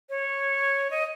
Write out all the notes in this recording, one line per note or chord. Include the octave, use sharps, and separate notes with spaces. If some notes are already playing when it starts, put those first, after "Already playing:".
C#5
D#5